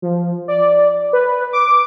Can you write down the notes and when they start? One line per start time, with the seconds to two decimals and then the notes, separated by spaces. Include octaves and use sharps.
0.02 F3
0.48 D5
1.13 B4
1.53 D6